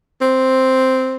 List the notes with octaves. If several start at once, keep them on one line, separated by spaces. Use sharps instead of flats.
C4